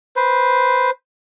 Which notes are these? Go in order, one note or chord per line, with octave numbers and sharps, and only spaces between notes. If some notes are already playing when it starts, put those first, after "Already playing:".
B4 C5